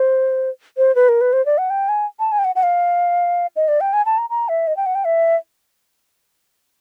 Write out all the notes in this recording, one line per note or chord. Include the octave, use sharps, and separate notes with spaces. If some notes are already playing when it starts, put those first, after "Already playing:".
Already playing: C5
C5
B4
A#4
B4
C5
D5
F#5
G5
G#5
A5
G#5
G5
F#5
F#5
F5
D#5
D5
G5
G#5
A5
A#5
A#5
E5
D#5
G5
F#5
G5
E5